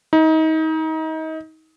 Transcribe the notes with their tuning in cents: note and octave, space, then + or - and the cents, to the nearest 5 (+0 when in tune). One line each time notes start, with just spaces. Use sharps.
D#4 +30